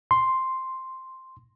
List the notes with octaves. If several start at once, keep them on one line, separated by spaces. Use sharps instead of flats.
C6